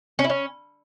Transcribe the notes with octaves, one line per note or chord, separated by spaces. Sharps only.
C#4
E4
C#4